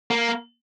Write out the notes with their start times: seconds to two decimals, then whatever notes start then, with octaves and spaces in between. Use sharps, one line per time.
0.11 A#3